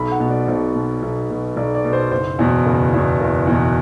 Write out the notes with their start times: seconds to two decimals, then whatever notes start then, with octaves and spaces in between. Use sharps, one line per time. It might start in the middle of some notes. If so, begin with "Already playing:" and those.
Already playing: B1 B5
0.11 F#5
0.20 B2
0.30 D5
0.48 B1 C5
0.75 B2
1.02 B1
1.30 B2
1.57 B1 D5
1.75 D5
1.84 B2
1.93 C5
2.11 F#1 C5
2.39 E2 B2
2.66 F#1
2.94 E2 B2
3.20 F#1
3.47 E2 B2